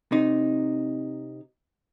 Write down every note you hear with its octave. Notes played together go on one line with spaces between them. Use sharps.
C3 D#4